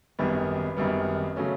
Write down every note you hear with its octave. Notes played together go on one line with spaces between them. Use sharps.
G#1 F#2 D#3 G3 B3
G#1 F#2 D#3 G3 B3
C#3 F#3 A3 C#4